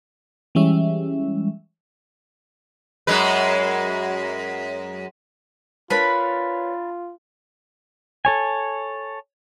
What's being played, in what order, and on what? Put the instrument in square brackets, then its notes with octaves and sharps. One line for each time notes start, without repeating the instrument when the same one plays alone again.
[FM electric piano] E3 G3 G#3 C#4 E5
[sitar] F#2 G#3 B4
[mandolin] D4 B5 [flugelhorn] F4 [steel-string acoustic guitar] A#4 B4 C#5
[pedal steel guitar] A4 C#5 G#5